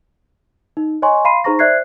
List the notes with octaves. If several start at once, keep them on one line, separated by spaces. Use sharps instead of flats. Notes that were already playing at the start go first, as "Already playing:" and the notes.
D#4
C#5 D#5 G#5 C6 C#6
F5 B5 C6 C7 D#7
D#4 G#4 C5 A#5 C#6 A#6
C5 D5 E5 F#6 G#6 C7